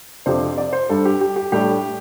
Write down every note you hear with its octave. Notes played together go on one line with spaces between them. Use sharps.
F2 C3 F3 D4 C5
D5
C5
G2 G3 D4 A4
G4
G4
G4
A2 G3 D4 G4